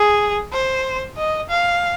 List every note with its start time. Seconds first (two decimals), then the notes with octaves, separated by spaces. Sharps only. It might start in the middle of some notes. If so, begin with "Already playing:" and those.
Already playing: G#4
0.52 C5
1.17 D#5
1.49 F5